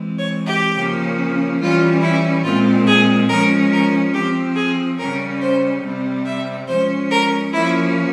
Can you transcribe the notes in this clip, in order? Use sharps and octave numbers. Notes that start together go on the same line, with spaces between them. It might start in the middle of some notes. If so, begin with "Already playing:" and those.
Already playing: E3 G#3 C4
C#5
G4
C#3 F3 A#3 C#4
E3 G3 C#4 F4
E4
A#2 G#3 C4 F4
G#4
F3 G#3 C#4 A#4
A#4
F3 C4 G4
G#4
C#3 G3 C#4 A#4
C5
C3 G3 C4
E5
F3 G#3 C#4 C5
A#4
F3 A#3 C#4 E4